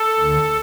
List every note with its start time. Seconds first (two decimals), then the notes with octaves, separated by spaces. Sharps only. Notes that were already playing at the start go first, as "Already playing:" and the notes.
Already playing: A4
0.19 D2 D3